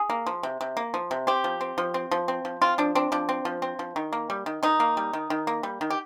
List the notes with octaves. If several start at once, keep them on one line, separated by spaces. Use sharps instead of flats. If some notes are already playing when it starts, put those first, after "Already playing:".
Already playing: G#4
A#3
F3
C3
C3
A#3
F3
C3
C4 G4
F3
C4
F3
C4
F3
C4
F3
C4 F4
F3 D4
C4 D4
F3 D4
C4
F3
C4
F3
D#3
A#3
G3
D#3
D#3 D#4
A#3
G3
D#3
D#3
A#3
G3
D#3
G4